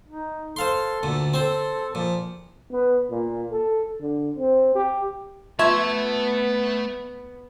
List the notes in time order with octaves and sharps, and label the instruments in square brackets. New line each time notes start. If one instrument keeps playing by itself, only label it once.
[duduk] D#4
[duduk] A4 [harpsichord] C5 F5 C6
[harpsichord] D2 A#2
[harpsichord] C4 C5 [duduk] A4
[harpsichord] A#2 [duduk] F3
[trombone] B3
A#2
A4
D3
C4
G4
[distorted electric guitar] A3 A5 [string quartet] B3 [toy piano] F4 C6 C#6 [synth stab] E5 G#6